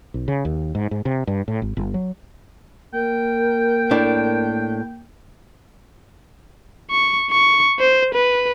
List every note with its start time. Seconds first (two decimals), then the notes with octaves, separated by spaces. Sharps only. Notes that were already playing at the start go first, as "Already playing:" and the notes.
0.14 B1
0.28 C#3
0.45 D#2
0.75 G#2
0.91 G#2
1.05 C3
1.27 G2
1.48 A2
1.62 G#1
1.77 G1
1.94 F#3
2.94 A#3 A#4 G5
3.91 A2 D4
6.90 C#6
7.31 C#6
7.80 C5
8.14 B4